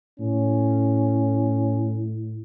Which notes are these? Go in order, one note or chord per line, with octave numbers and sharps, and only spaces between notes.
A2 C#4